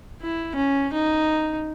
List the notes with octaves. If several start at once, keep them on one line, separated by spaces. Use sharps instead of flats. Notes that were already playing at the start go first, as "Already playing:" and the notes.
E4
C#4
D#4